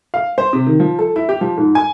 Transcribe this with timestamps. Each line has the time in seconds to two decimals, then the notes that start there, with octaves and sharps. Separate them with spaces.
0.14 F5
0.38 C5
0.53 C3
0.67 D#3
0.80 F3
0.99 A4
1.16 E4
1.29 G4
1.41 F3
1.57 G#2
1.75 G#5